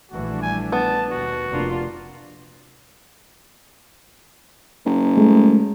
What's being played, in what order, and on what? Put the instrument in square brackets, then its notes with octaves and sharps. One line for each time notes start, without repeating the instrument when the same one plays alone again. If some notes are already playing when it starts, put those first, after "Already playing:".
[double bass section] A#1 E3 [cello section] G3 A3 D4 [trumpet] F#4
[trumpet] G#5
[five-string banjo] B3 [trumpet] A5
[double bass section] D#2 B2 [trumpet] F#4
[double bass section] F1 A#3 [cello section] C3 D4 F4
[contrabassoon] F#1
[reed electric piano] G#3 A3